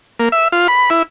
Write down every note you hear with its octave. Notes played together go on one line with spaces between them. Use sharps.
A#3
E5
F4
B5
E4